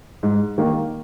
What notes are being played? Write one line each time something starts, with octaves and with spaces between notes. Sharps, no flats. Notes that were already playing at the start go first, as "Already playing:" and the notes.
G#2
D#3 A#3